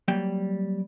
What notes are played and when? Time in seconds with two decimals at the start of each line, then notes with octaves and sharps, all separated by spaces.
0.08 F#3 G3 A#3 G5